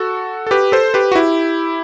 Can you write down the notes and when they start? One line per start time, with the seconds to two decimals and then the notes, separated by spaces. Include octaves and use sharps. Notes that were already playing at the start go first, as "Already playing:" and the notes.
Already playing: F#4 A4
0.47 A4
0.51 G4 B4
0.72 A4 C5
0.94 G4 B4
1.12 F#4
1.15 E4 G4